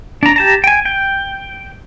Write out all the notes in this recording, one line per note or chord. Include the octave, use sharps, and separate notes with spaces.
D4 A#5
G4 A5 A#5
G5 G#5
G5